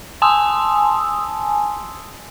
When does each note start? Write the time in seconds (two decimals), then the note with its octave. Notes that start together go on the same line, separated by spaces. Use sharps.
0.22 G#5 A5 C6 D#6 E6